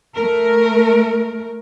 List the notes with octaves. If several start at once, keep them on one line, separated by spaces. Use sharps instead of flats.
A3 A#4